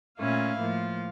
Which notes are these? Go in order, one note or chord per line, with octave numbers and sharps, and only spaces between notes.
A#2 A3 C#4 E4 F5
A2 F3 A#3